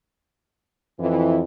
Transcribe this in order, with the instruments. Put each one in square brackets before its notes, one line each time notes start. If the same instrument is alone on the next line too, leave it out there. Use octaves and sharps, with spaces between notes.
[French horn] F2 [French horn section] E3